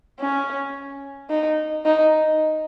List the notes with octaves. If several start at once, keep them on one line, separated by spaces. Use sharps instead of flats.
C#4
D#4
D#4